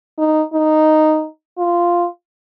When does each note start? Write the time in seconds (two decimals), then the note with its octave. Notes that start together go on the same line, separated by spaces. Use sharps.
0.18 D#4
0.53 D#4
1.58 F4